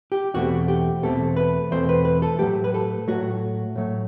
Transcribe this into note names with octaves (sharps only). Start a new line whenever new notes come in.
G4
E2 B2 A3 C4 F#4
G4
E2 B2 A3 C4 A4
B4
E2 B2 A3 C4 C5
B4
B4
A4
A2 F#3 A3 G4
B4
A4
A2 F#3 A3 F#4
A2 F#3 A3